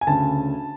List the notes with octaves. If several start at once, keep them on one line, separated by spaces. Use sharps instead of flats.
G#5
D2 C#3 A5